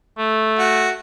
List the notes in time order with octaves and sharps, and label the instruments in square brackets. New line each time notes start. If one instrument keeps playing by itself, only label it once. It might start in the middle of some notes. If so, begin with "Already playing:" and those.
[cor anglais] A3
[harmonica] F#4